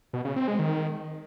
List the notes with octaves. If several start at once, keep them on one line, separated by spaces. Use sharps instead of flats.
B2
C#3
C4
G#3
D#3